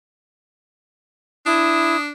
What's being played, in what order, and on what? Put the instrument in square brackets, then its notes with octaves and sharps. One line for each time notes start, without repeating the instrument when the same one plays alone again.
[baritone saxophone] D4 [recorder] E4 [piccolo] D#6